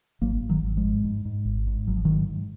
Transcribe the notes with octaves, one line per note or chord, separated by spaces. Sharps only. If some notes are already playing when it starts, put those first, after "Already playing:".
G#1 F#3 A#3
G#1
D#3 F#3
G#1
F3 G#3
G#2
G#2
G#2
G#1
G#2
G#1 F#3
F3
G#2 D#3 F#3
G#2